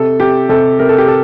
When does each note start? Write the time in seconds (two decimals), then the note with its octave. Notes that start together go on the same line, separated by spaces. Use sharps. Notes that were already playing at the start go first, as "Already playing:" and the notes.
Already playing: C3 A4
0.20 C3 G4
0.49 C3 A4
0.79 C3 A#4
0.89 A4
0.98 G4
1.08 A4